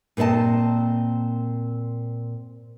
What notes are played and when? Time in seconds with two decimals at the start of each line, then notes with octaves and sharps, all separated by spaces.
0.17 A#2 C4 B4 D#5 A5